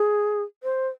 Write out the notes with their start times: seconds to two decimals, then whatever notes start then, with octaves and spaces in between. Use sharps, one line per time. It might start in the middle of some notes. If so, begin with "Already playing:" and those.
Already playing: G#4
0.63 C5